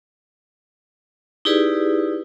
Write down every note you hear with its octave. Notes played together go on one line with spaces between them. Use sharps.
D#4 E4 G4 G#4 B4 D5